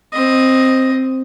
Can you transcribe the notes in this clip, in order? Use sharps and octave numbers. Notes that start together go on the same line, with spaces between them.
C4 D#5